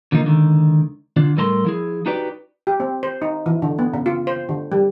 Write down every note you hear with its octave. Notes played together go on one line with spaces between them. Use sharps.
D3 F3 A#3 D#4
C#2 D3 D#3
D3 D4 F4
A2 G3 A4 A#4 A5 C6
F3 E4 G#4
D#4 F#4 G4 B4 D5
G4
C4
C5
D#4
E3
D3
B3
C#3
F4
C5
D3
G3